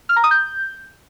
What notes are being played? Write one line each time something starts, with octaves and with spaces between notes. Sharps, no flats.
F6
A#5
D#6
G6